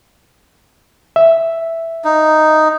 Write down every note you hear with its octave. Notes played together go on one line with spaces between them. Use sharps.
E5
D#4